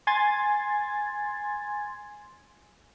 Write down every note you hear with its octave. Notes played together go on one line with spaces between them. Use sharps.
G#5 C6 G#6 A6